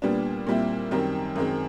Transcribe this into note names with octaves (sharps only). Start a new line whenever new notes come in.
A#2 G3 B3 D4
A#2 G3 C4 E4
F#2 D#3 G3 C4
F#2 D#3 G#3 C4